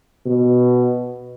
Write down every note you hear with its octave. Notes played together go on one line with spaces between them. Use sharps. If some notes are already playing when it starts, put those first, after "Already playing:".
B2